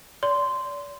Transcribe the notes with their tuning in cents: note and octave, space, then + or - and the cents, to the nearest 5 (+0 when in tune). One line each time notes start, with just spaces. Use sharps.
D5 -35 C6 -10